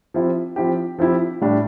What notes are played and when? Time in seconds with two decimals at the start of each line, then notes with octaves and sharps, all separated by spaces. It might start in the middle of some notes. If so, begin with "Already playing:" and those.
0.14 F3 C4 E4 G4
0.56 F3 C4 E4 G4
0.98 F3 C4 E4 G4
1.41 A2 G3 D4 G4